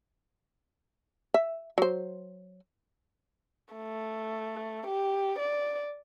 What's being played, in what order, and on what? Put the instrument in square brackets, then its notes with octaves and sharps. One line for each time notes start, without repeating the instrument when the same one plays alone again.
[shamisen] E5
F#3 C5
[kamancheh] A3
G4
D5